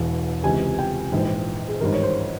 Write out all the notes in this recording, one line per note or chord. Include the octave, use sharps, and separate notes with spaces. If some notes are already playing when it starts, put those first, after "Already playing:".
Already playing: E1 E2 E3
C#2 C3 E3 G#5
G5
A#1 G#2 E3
G#4
G#1 G2 E3 A#4
C#5
C5